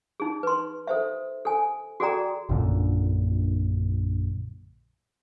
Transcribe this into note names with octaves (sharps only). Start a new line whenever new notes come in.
D#4 G#4
B4 C6
A4 C5 E5
A4 G#5
F#4 G#4 A4 D5 G5 A#5
A#1 F#2 A#2 D3